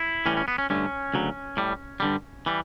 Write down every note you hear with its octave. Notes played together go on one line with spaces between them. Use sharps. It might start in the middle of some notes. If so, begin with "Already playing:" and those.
Already playing: E4
A2 E3 G3 C#4
C#4
B3
C#4
G2 D3 A3 C#4
D2 C#3 F#3
A2 G3
G2 D3 G3
E3 G3